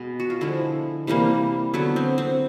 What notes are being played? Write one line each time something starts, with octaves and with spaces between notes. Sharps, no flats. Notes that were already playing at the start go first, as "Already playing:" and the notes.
Already playing: B2 G#3 B3
F#4
F4
D3 F3 G#3 E4
C3 E3 G3 A#3
D3 F#3 B3 E4
C4
C4